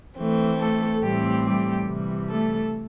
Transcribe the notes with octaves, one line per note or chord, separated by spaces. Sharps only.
E3 A3 C4
A3 A4
A2 E3 G3 A3 C4 G4
G3 G4
C3 E3 G3
A3 A4